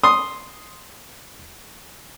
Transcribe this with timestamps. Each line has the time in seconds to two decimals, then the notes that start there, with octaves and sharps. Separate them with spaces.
0.04 C6 D#6